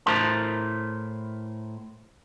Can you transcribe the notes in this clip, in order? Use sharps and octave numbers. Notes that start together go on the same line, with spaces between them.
A2 E4 A#4 C5 A5 C6